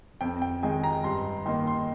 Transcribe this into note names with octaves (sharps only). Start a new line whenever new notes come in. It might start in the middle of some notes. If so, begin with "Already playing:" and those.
F2 G5
G5
D#3 G#3 D#4 G#5
A#5
G2 C6
D#3 A#3 D#4 C6
C6